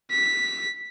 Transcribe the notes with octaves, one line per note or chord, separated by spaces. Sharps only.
B6